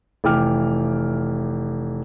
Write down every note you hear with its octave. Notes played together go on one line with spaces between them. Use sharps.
F1 E3 G5 D6 F6